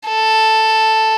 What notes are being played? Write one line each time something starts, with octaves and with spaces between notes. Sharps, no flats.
A4